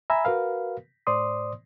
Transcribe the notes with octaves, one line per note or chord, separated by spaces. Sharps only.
E5 G#5 A#5 B5 E6
F#4 A#4 B4 F5
A2 C5 D5 C6 D#6